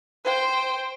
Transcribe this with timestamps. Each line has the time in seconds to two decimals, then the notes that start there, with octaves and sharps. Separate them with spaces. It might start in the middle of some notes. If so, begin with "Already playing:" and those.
0.25 C5 G5